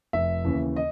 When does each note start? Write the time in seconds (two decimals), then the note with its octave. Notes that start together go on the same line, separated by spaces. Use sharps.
0.13 F1 E5
0.44 D#2 C#3 E3
0.76 D#5